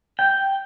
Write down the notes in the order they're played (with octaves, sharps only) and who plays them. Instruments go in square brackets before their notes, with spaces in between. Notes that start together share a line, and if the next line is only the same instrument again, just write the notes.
[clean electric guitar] G5